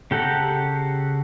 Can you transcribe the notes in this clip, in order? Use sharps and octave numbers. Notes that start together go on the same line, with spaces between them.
C#3 G4 A4 F#5 A#5